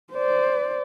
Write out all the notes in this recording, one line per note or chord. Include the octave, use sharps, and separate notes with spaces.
C5 D5